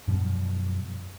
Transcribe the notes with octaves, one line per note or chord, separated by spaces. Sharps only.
F#2 B2 F3 G3